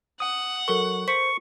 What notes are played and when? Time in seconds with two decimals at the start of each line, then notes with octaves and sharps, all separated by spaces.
0.20 F#5 D#6
0.68 F#3 A4 A#4 C#6
1.08 C5 C#6 B6